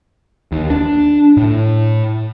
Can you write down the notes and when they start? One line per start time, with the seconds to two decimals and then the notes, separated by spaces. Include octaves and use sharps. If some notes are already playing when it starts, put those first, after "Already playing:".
0.52 D#2
0.70 D4
1.37 A2